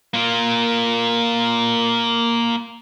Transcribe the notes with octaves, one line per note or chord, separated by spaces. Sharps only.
A#3 F4